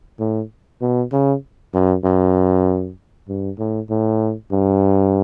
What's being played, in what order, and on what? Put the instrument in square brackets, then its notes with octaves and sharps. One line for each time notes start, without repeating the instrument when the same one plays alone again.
[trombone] A2
B2
C#3
F#2
F#2
G2
A2
A2
G2